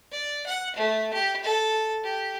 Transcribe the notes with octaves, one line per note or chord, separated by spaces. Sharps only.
D5
F#5
A3
G4
A4
G4